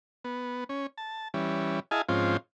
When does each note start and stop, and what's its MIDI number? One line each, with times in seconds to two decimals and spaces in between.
0.24 0.64 59
0.69 0.87 61
0.98 1.28 81
1.34 1.80 52
1.34 1.80 55
1.34 1.80 61
1.91 2.02 64
1.91 2.02 68
1.91 2.02 75
1.91 2.02 77
1.91 2.02 80
1.91 2.02 81
2.09 2.37 44
2.09 2.37 53
2.09 2.37 60
2.09 2.37 61
2.09 2.37 65